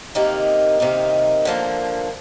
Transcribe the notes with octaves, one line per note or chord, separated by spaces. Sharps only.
C3 D#3 A#3 D#4
C3 D#3 A#3 D#4
D3 F3 A#3